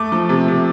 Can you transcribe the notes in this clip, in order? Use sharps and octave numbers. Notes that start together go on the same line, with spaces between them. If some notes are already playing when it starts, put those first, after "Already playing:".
Already playing: A3 D6
F3
C3
C3